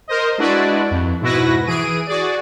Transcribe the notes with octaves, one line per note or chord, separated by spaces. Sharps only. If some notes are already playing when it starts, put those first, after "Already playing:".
A#4 C5 D#5
G#3 D4 E4 F#4 B4 D5
F2
G#2 B2 E4 F#4 B4 A#6
E3 G#4 D7 D#7
F#4 G#4 D5